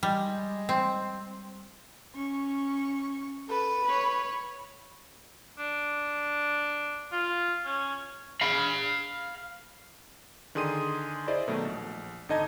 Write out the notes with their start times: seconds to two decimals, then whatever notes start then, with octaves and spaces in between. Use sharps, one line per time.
0.03 G3 G#3
0.69 C4
2.15 C#4 C#6
3.49 A4 B4
3.85 C#5 B5
5.59 D4
7.12 F4
7.65 C#4
8.41 F5 B5
10.55 D3 D#3 G#4 C6 D#6 D#7
11.27 E4 G#4 C5 D5 D#5
11.48 B2 D#3 F#3 A3
11.65 A#1
12.29 G#1 D3 D#4 D#5 A5 G#6